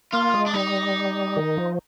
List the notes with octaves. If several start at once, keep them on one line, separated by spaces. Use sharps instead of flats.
A#3 F4
G#3
D4
G3 D#4
D#3
F3